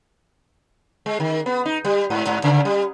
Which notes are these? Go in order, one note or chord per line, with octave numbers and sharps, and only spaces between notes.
G#3
D#3
B3
D#4
G3
G#2
G#2
C#3
G3